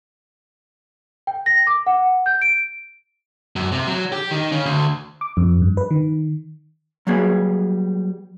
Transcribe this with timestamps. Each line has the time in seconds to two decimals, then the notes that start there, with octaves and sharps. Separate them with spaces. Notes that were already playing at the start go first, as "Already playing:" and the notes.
1.27 G5
1.46 A#6
1.67 D6
1.87 F#5
2.26 G6
2.42 D7
3.56 F#2
3.72 C3
3.87 F#3
4.12 G4
4.31 D#3
4.52 C#3
4.66 D2
5.21 D6
5.37 F2
5.62 G2
5.77 B4
5.91 D#3
7.07 F#3 G3 A#3 B3 G#4